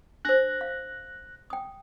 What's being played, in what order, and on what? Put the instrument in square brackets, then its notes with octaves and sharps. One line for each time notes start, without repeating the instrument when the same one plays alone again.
[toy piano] D4 C5 [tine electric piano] F#6 A#6
[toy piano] F5
G5 D#6